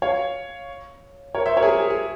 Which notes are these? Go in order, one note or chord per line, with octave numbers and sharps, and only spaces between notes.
C#5 F5
A#4 C#5
C5 E5
A#4 C#5
G#4
G4 A#4
G#4
G#4